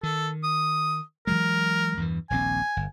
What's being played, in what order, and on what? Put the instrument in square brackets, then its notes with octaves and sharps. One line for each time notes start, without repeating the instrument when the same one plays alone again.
[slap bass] D#3 [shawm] A4
[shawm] D#6
[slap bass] E3 F#3 G#3 [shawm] A#4
[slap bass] E2 G2 E3
[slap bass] D#1 A#1 C4 [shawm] G#5
[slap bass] G1